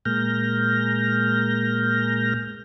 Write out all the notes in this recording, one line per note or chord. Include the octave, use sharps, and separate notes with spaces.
A#2 G#3 A#3 F6 G6 A#6